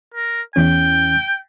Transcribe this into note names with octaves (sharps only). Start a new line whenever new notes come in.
A#4
E2 E3 C#4 G5